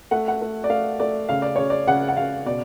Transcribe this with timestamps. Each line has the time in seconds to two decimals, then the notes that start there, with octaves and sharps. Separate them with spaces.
0.11 A3 F#5
0.28 F#5
0.41 A3
0.64 D5
0.70 A3 F5
1.00 A3 D5
1.29 C#3 F5
1.42 D5
1.56 C#3 C#5
1.70 D5
1.87 C#3 F#5
2.08 F#5
2.17 C#3 F5
2.46 B2 D5